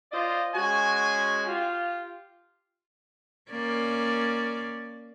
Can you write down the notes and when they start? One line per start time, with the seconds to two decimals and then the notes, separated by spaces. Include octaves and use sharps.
0.12 F4 C5 D5 D#5
0.55 G#3 C#4 F#4 G#5
1.46 F4 G4
3.51 A#3 C#4 D5